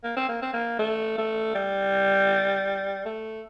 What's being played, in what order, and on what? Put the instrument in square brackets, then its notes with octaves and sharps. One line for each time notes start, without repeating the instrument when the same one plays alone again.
[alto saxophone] A#3
C4
A#3
C4
A#3
A3
A3
G3
A3